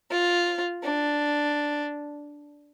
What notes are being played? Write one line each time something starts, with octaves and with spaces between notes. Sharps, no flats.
F4
D4